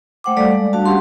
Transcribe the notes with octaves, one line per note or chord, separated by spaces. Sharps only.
A3 C5 F#5 G5 D6
G3 A3 A4 D5 F5
G#3
G3 D4 F#4 F5 A5
C#4 F#4 G4 F#5 C6